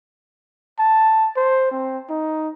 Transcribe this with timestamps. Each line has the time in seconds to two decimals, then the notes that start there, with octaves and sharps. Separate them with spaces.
0.79 A5
1.36 C5
1.71 C4
2.10 D#4